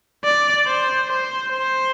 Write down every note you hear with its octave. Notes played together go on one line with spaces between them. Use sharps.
D5
C5
C5
C5